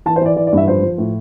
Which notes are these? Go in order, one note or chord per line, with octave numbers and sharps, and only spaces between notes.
E3 A5
C5
E3 D5
E3 D5
D5
G2 E5
F3 C5
F3
A2